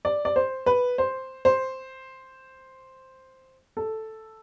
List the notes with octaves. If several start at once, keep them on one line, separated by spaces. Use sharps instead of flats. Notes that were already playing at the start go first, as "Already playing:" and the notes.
D5
D5
C5
B4
C5
C5
A4